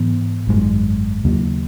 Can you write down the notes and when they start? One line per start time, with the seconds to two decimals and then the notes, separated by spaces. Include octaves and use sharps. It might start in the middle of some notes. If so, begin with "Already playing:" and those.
Already playing: G#2 E3 B3
0.47 G#1 F#2 D#3 G#3
1.24 D#2 C#3 F#3 A#3